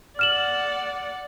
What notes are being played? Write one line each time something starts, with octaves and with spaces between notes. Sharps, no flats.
D5 F#5 F6 E7 F#7